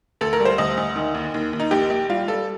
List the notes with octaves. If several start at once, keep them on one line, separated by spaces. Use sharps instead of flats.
D2 A4
A#4
G3
C5
D2 D#5
D2
D#3
D#2
D#2
D#2
D#4
A#1 G4
A#1
G3 F4
G3 A4